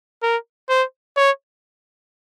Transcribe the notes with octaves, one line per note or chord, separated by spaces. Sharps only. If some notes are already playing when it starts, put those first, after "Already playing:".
A#4
C5
C#5